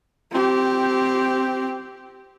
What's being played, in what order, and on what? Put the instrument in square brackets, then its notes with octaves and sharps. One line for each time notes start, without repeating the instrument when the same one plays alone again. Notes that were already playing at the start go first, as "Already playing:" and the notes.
[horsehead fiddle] C4 G4